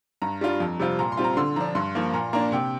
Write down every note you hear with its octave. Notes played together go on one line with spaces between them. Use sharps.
G2 A#5
G3 D4 F4
F2
C3 G3 C4 F4
A#2 A#5
C6
G3 C4 F4
A#5
D3 C6
F3 D4 A#5
G2 C6
F3 A#3
A#2 A#5
A#3 D4 A#5
C3 G5